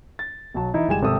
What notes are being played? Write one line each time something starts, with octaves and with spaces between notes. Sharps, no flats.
A6
B1 F#3 A5
E3 D#4 E4
G1 G3 G#3 G#5 E7
G#1 C3 A4 D#6 E6